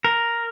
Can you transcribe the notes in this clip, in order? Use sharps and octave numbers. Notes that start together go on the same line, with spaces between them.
A#4